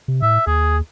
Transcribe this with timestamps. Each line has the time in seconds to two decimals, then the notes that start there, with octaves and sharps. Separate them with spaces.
0.08 C3
0.22 A2 E5
0.47 D#2 G#4